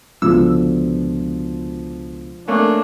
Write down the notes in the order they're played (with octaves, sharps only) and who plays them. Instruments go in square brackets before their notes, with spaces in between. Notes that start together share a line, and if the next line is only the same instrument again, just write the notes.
[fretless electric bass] C#2 B2 D3 [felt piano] F3 [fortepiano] E6
[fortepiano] A3 A#3 C#4 [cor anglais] D4